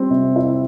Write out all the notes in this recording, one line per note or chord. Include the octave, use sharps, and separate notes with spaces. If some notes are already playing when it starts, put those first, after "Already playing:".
Already playing: G3 C4
C3
E4